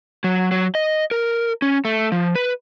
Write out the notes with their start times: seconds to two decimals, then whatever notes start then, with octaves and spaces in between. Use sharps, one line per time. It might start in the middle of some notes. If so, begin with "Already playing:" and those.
0.24 F#3
0.51 F#3
0.75 D#5
1.11 A#4
1.62 C#4
1.85 A3
2.12 F3
2.35 B4